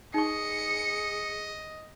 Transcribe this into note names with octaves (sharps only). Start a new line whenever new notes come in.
D#4 G#4 D#5 C#6 C#7